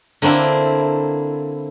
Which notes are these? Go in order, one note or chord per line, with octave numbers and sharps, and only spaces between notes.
D3 A#3 C4 D4 E4